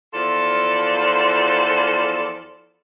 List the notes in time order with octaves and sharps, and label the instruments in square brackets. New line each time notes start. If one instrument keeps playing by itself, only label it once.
[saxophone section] E2 F3 F4 A4 D5